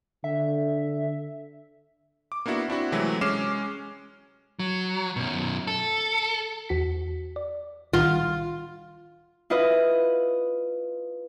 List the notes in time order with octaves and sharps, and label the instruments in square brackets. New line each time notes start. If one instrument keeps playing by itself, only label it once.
[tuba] D3 [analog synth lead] E5
[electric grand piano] D6
A#3 B3 D4 E4 F#4
C4 D4 E4 F#4
C3 E3 F#3 G#3 A3
G#3 C#4 D6 F6 C7 E7
[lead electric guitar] F#3
F#2 B2
A4
[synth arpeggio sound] E2 F#4 B6
D5
[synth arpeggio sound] C2 D#3 F#5 [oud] F4
[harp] E4 F4 B4 D#5